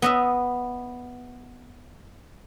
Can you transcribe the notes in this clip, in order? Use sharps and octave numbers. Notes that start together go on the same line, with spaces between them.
B3 D#5 E5